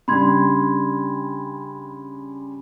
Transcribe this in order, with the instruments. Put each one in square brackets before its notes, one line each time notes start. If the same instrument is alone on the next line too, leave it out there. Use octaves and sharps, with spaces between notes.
[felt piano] C#3 G3 D4 [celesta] B5 C6 G#6